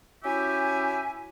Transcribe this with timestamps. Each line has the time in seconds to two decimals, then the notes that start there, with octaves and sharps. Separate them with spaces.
0.23 C#4 E4 F#4 G4 E5 G#5